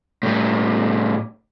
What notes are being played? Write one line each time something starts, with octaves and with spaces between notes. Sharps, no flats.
A2 G3